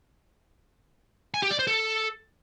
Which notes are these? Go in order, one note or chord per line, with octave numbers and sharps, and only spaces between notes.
G#5
G4
D5
C5
A4